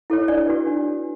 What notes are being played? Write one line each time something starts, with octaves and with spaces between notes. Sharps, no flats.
E4 A4 C#5
D4 D5
F#4 B4
D4